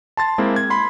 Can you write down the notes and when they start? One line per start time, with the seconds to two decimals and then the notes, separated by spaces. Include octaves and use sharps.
0.17 A5 C6 A6
0.38 G#3 A#3 C4 E4
0.56 G#6
0.70 B5 C6